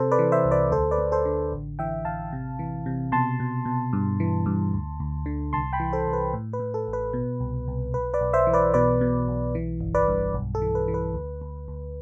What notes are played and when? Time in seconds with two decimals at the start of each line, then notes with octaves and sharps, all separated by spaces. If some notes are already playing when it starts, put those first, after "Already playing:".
Already playing: C3 A4 C5
0.12 B4 D5
0.19 E3
0.32 C5 E5
0.44 C2
0.51 B4 D5
0.71 D2 A4 C5
0.91 B4 D5
0.98 D2
1.12 A4 C5
1.25 D3
1.52 A1
1.79 E3 E5 G5
2.05 A1 F5 A5
2.33 C3
2.59 E3
2.86 C3
3.12 B2 A5 C6
3.40 B2
3.65 B2
3.93 G2
4.20 E3
4.46 G2
4.74 D2
5.00 D2
5.26 D3
5.53 C2 A5 C6
5.73 G5 B5
5.80 E3
5.93 A4 C5
6.07 C2
6.13 B4
6.34 A2
6.53 B4
6.60 A2
6.74 A4
6.87 A1
6.93 B4
7.13 B2
7.40 C2
7.68 C2
7.94 B1 B4
8.14 B4 D5
8.21 B1
8.33 C5 E5
8.47 E3
8.53 B4 D5
8.74 B2 B4 D5
9.01 B2
9.28 B1
9.55 E3
9.80 G1
9.94 B4 D5
10.08 G2
10.34 B1
10.55 A4
10.62 E3
10.75 B4
10.88 E3
10.94 B4
11.14 D2
11.41 D2
11.68 D2